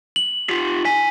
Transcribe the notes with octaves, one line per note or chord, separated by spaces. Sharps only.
F#7
F4 G4
G#5 B6